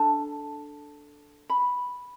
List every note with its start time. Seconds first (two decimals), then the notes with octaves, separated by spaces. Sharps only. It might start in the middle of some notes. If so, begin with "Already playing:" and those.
Already playing: D4 A4 A5
1.50 B5